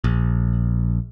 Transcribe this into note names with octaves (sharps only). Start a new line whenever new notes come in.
A#1